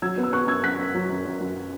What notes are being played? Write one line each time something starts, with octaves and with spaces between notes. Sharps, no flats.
F#3 E6 G#6
B3
E6
B3 C#6 F#6
F#2 E6 G#6
F#2 F#6 B6
F#2
F#3
F#2
F#2
F#2